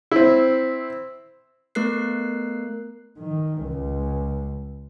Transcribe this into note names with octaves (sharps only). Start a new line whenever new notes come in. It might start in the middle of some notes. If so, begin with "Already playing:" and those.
C4 E4
A3 B3 A#4 F#6 C7
D#3
C#2